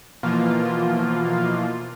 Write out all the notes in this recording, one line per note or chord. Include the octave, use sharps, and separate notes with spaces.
B2 E3 F3 A#3 F4